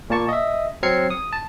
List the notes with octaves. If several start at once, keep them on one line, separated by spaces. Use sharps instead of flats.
A#2 A#3 A5 C#6
D#5 E5
F#3 C4 F6 G#6 C7 C#7
D#6
A5